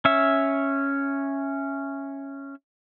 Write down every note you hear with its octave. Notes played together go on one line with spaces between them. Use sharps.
C#4 E5